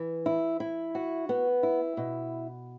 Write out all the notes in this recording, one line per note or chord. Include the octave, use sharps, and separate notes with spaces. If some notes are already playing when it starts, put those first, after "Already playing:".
Already playing: E3
E4
E4
F#4
B3
E4
B2